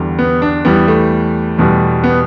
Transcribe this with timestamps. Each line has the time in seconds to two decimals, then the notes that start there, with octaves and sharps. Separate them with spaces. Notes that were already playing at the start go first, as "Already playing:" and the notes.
Already playing: E2 D3 G3
0.19 B3
0.42 D4
0.65 E2 E3 G3 B3
0.88 A3
1.58 E2 B2 G3
2.04 B3